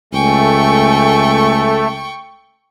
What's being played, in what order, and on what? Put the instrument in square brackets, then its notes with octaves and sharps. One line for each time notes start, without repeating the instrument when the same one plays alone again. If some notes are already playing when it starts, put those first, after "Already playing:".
[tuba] C#2 [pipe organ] A3 [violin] G5 C#6 [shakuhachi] G#5